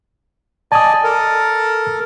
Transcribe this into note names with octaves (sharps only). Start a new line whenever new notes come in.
D5 D#5 G#5 A5 D#6
A4 A#4